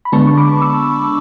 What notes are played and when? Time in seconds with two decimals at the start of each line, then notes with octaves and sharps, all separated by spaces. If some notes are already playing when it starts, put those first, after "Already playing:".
0.05 B5
0.12 D3 G#3 B3 D4 A5 C#6
0.27 C#6
0.37 B5 D6
0.62 C#6 E6